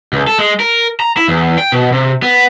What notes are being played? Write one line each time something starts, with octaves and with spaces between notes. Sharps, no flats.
C#2
A4
G#3
A#4
A#5
E4
E2
G5
B2
C3
B3